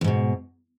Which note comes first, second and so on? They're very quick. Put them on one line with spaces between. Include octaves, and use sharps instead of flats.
F2 G#2 B2